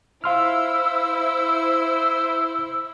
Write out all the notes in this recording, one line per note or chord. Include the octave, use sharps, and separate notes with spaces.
E4 C5 F5 C6 E6 F6